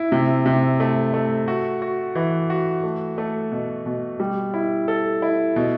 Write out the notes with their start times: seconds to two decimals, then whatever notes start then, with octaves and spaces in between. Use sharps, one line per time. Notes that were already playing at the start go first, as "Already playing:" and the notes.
Already playing: E4
0.12 C3
0.46 C3
0.80 A3
1.14 A3
1.48 F#4
1.82 F#4
2.15 E3
2.50 F#4
2.84 A3
3.18 A3
3.52 B2
3.86 B2
4.20 G3
4.54 E4
4.88 A4
5.22 E4
5.56 B2